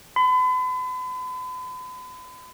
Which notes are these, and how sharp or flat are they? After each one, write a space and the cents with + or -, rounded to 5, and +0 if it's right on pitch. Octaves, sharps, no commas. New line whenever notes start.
B5 +40